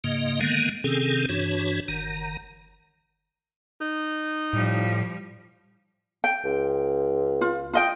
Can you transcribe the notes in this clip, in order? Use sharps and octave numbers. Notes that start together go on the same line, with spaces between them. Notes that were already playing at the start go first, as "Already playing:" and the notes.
G#2 C#3 A#3 D#5
D3 D#3 G#3 A#3 B3
C3 D#3 C4 C#4 G#4 A4
G2 E3 D4 F#4 C#5
F#1 D#3 A#5
D#4
A2 F3 G3
G5
C#2
F4
F4 D#5 G5